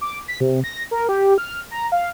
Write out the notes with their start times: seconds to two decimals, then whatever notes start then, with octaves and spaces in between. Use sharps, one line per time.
0.01 D6
0.28 B6
0.40 C3
0.64 A#6
0.91 A#4
1.09 G4
1.38 F6
1.71 A#5
1.92 F5